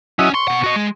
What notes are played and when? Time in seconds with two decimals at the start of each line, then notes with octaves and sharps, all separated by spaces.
0.19 F#3 C#4 E4 D#5
0.34 C6 C#6
0.48 B2 F#5
0.64 F#4 D#5
0.76 G#3